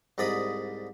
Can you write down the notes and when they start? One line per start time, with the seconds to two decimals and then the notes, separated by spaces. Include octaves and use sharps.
0.18 C2 G#2 D5 D#5 B5 D#6